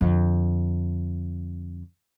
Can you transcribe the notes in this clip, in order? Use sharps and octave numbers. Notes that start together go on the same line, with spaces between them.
F2 D3